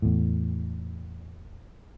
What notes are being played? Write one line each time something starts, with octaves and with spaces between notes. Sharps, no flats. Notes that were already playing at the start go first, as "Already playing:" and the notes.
E2 A2